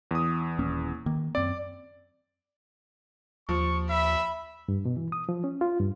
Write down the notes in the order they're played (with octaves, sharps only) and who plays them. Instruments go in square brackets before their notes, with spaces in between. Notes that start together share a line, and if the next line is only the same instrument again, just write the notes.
[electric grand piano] E2 D#6
[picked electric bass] D#1 A#3 C#4
D#3 A#3
[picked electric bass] F#2 C4 [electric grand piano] D5
[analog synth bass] D#2 [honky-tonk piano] F3 [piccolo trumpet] C#6
[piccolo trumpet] E5 [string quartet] B5
[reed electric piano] G2
B2
E3
D#6
F3
C#4
F4
G2